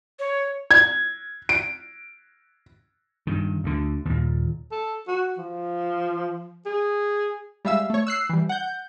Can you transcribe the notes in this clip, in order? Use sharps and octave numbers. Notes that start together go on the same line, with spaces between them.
C#5
G#6
D7
G2 D#3
D2 D3
D#2 A#2
A4
F#4
F3
G#4
G3 G#3 E5 F5 E6
A3 C#5
E6 F#6 C7
E3 G3
F#5 G6